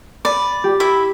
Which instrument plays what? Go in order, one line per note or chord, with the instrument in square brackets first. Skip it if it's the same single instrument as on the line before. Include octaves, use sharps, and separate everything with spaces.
[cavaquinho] D5 [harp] B5 D#7
[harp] G4
[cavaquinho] E4 E5